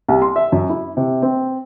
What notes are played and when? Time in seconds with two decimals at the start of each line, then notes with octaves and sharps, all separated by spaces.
0.08 C2
0.22 C6
0.36 E5
0.52 F#2
0.69 E4
0.97 C3
1.22 C4